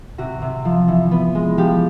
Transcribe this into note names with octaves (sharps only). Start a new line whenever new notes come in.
C3 F#4
C3
F3
E3
B3
G#3
F3 G4